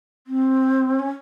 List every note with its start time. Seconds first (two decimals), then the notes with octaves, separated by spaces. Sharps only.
0.27 C4
0.99 C#4